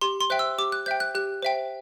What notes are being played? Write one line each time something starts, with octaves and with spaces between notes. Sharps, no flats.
G4 C6
C6
C5 E5 G5 F#6
E6
G4 D6
F#6
C5 E5 G5 G6
F#6
G4 F#6
C5 E5 G5